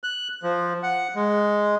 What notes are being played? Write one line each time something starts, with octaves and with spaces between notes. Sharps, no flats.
F#6
F3
F#5
G#3